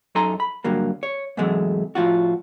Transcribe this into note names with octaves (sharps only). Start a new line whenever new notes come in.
F#2 D#4 A4 G#5 A#5 C6
B5
G2 D3 F#3 A#3
C#5
G#2 C3 E3 F#3 G#3 A3
A2 F3 F4 F#4